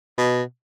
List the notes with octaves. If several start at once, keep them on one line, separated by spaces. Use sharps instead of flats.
B2